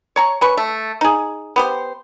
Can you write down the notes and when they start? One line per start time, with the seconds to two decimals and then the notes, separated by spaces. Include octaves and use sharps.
0.16 C#5 A#5 C#6
0.41 C#4 B4 C#6
0.57 A3
1.01 D#4 G#4
1.56 B3 G4 C5